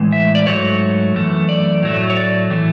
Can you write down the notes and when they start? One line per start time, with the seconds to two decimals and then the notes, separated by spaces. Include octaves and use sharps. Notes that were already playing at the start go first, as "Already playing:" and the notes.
Already playing: A2 E3 G#3
0.12 E5
0.35 D5
0.46 G#2 F#3 A3 C#5
1.14 F#2 E3 A3
1.49 D5
1.83 A2 F#3 A3
2.10 C#5
2.17 D5
2.50 A2 E3 A3